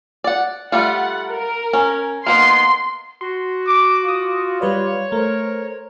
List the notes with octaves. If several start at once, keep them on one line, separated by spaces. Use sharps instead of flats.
D5 F#5
G3 A3 F4 F#5
A#4
C#4
A#3 B3 D#4 C6
F#4 C6
D6
F4 D6 D#6
G3 B4 C#5 D5
A3 A#4 C5